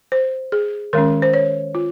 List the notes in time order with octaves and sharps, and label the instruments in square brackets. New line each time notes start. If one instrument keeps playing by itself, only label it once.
[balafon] C5
G#4
D#3 G#3 C#4 A#4
C5
C#5
F4